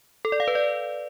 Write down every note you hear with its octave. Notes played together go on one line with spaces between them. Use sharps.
A4
D5
F5
B4
D5